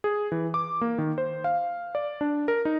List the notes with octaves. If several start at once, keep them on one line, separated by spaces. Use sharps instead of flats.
G#4
E3
D6
A#3
D#3
C5
F5
D5
D4
A#4
D#4